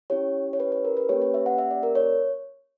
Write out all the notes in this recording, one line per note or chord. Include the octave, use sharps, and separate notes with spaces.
C#4 E4 G4 C#5
C#5
B4
B4
A#4
B4
A#3 C#4 G4 C#5
B4
E5
F#5
E5
D5
A#4
C#5